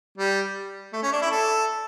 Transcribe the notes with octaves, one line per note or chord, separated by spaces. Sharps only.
G3
A3
C#4
D4
E4
A4